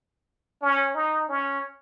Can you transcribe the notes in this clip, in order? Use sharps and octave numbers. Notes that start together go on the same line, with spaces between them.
C#4
D#4
C#4